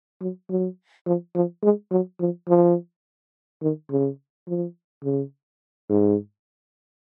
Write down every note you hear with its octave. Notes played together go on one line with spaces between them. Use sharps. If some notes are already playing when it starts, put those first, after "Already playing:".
F#3
F#3
F3
F3
G#3
F#3
F3
F3
D#3
C#3
F3
C#3
G#2